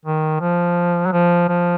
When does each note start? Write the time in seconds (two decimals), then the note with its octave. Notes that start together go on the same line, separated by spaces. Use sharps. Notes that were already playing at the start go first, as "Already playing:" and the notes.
0.05 D#3
0.41 F3
1.06 F#3
1.12 F3
1.49 F3